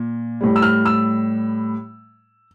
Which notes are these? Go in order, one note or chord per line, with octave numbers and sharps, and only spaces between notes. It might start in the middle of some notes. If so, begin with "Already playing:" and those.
Already playing: A#2
A2 G3
E6
F6
E6